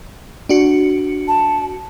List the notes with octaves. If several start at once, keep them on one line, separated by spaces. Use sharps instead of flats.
D4 F#4 C#7
A5